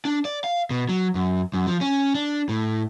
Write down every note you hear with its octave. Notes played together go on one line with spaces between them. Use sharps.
D4
D5
F5
B2
F#3
F#2
F#2
F3
C#4
D4
A2